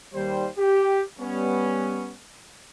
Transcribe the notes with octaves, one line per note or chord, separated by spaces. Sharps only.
D#2 G3 C5
G4
G3 B3 C#4